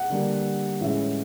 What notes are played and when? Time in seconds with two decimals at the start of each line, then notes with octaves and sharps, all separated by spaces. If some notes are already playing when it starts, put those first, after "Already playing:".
Already playing: F#5
0.10 D3 G3 A#3 D4
0.81 A2 E3 G#3 C#4 E5